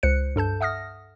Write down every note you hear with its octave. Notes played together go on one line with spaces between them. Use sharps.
C#2 C5 F#6 C#7
G2 A4 A5 G6
E5 F#5 D#6 F6 A#6